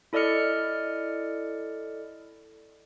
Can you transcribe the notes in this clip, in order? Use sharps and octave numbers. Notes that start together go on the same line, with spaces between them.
E4 A4 D5 D#5 F6 C#7